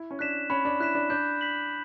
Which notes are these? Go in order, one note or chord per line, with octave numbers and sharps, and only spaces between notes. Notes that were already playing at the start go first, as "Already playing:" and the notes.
Already playing: E4
C#4
D4 F#6 B6 E7
C#4 B5
D4
E4 F#6 B6 E7
D4
D4 G6
B6 F#7